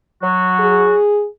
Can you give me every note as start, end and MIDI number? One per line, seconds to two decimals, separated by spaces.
0.23 0.95 54
0.23 0.95 66
0.60 1.27 68